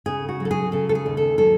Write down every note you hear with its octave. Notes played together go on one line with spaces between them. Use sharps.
C#3 G#4
F#4
F#3
A4
G#4
C#3 A4
A4
G#4
D#2
A4
F#3 A4